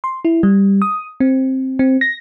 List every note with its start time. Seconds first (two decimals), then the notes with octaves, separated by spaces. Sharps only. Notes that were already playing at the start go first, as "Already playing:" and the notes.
0.04 C6
0.25 E4
0.43 G3
0.82 D#6
1.20 C4
1.79 C4
2.01 A#6